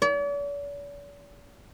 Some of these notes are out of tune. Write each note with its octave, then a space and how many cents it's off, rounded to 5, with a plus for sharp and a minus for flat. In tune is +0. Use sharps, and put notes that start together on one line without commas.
D5 -45